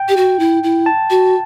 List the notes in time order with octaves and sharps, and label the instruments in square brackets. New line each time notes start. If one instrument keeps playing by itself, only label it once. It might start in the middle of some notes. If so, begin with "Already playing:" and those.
Already playing: [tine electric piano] G5
[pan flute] G4
F#4
E4
E4
[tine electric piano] A5
[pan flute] F#4